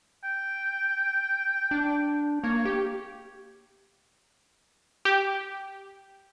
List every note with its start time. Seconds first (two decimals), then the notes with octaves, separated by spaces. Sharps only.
0.24 G5
1.71 D4
2.44 A#3 C#5
2.65 G4
5.05 G4